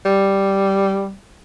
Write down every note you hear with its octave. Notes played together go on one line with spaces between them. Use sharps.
G3